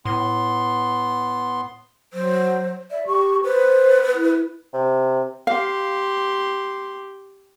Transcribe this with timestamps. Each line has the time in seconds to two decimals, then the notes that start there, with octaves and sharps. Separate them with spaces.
0.05 A2 B3 C6
2.13 F#3 C5
2.91 D5 E5
3.07 G4 C#6
3.44 B4 C5
4.15 E4
4.74 C3
5.47 G4 F5 C6